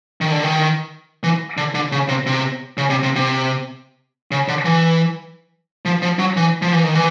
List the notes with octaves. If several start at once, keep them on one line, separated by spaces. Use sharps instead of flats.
D#3
D3
D#3
E3
D3
D3
C#3
C3
C3
C#3
C3
C3
C3
C#3
D3
E3
F3
F3
F#3
E3
F3
E3
D#3
E3